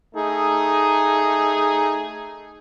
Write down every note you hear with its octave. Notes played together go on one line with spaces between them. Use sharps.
A3 D#4 G#4